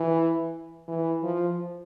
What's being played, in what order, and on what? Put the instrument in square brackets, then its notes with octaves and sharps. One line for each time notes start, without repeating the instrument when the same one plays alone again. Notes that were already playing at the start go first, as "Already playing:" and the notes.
Already playing: [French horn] E3
E3
F3